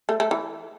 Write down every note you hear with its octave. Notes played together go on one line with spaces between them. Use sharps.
A3
A3
E3